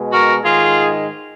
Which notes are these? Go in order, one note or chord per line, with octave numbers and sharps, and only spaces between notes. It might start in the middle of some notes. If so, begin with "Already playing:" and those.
Already playing: B2 G#3
F#4 A#4
G#2 D#3 G#3 F4 G#4